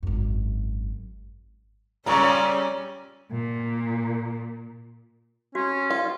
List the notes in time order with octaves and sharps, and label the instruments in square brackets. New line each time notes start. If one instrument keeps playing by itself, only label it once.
[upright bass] G#1 F#2
[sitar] A#2 C#3 [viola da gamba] G3 C#4 D5 [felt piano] A#5 C#6
[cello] A#2
[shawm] C#4 [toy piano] F#4
[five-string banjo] F4